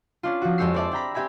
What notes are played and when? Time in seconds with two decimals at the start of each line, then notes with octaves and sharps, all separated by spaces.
0.23 C#4 D4 F4
0.42 F3 F#4
0.58 F2 G#3 G4 C#5 E6 C7
0.74 C4 C5 D5 E5 A5
0.91 D4 G5 A#5 B5
1.14 C4 G4 E5 G#5 B5